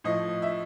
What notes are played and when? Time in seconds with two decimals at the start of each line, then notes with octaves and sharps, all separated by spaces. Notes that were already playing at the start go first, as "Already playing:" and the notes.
0.04 A2 F3 D#5
0.42 E5